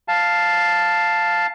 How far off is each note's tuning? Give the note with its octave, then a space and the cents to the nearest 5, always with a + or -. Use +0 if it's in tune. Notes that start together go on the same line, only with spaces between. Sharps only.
F5 +0 A5 +0